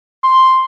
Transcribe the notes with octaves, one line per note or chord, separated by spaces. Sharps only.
C6